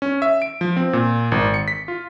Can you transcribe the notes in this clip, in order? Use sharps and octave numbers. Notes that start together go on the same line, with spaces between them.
C#4
E5
D7
F3
C4
A#2
G#1
C#7
B6
F4